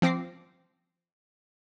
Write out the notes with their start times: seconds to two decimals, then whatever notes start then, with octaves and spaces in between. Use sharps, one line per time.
0.02 F3 C4 D6 A#6 C7